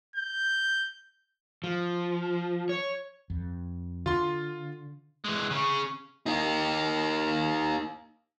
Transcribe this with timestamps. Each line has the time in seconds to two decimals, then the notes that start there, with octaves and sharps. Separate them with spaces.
0.16 G6
1.64 F3
2.69 C#5
3.30 F2
4.06 D3 F4 C6
5.24 E3 G#3
5.50 C#3 C#4
6.26 A#3 D#4